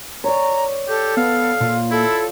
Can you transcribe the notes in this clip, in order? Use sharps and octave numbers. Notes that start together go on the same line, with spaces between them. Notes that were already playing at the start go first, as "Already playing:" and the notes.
C#5 D5 A#5
G4 A4
B3 F5
A#2 F4
E4 A4